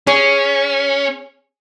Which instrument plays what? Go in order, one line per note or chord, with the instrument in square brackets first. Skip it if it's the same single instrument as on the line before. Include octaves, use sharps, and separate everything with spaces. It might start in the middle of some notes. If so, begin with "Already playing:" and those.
[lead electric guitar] C#4 [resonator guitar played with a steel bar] G#4 C#5